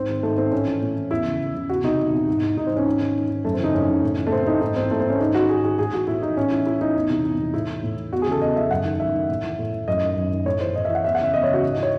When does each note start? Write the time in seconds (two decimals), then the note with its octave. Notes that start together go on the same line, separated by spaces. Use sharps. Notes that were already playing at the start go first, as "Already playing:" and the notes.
Already playing: G#2 C4
0.09 D#3
0.23 G#2 A3
0.38 D#3 C4
0.52 A2 C#4
0.67 E3
0.82 A2
0.96 E3
1.11 E2 E4
1.25 C#3 E3
1.40 E2
1.54 C#3 E3
1.69 E2 F#4
1.84 C3 E3 D#4
1.99 E2
2.13 C3 E3
2.28 G#2
2.43 E3
2.57 G#2 D#4
2.67 C4
2.72 E3 C#4
2.86 G#2
3.01 D#3
3.16 G#2
3.30 D#3
3.45 F#2 A3
3.54 C4
3.59 C#3 E3 D#4
3.74 F#2 C#4
3.88 C#3 E3
4.03 A2
4.17 E3
4.27 A3
4.32 A2 C4
4.47 E3 D#4
4.61 G#2 D#4
4.76 E3 C4
4.91 G#2 A3
5.00 C4
5.05 E3 C#4
5.20 G#2 D#4
5.35 D#3 F#4
5.49 G#2 G#4
5.64 D#3 G#4
5.78 A2 G#4
5.93 E3 F#4
6.07 A2 E4
6.22 E3 D#4
6.37 A2 C#4
6.51 E3 E4
6.66 A2 E4
6.80 E3 D#4
6.95 E2
7.10 C3 E3
7.25 E2
7.39 C3 E3
7.54 A2 E4
7.69 E3
7.83 A2
7.97 E3
8.12 E2 F#4
8.22 G#4
8.27 C#3 E3 A4
8.42 E2 D#5
8.56 C#3 E3 E5
8.70 F#2 F#5
8.85 D#3
9.00 F#2 E5
9.14 D#3
9.29 A2
9.44 E3
9.59 A2
9.73 E3
9.87 F#2 D#5
10.02 D#3
10.17 F#2
10.31 D#3
10.46 A2 C#5
10.60 E3 C5
10.75 A2 D#5
10.85 E5
10.90 E3
10.95 F#5
11.04 E2 E5
11.15 F#5
11.19 C#3 E3 E5
11.34 E2 D#5
11.43 C#5
11.49 C#3 E3 F#4
11.63 G#2
11.72 D#5
11.77 E3
11.83 C#5